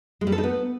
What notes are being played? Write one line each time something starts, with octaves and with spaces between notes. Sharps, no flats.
G#3
G3
A4
D#4
B3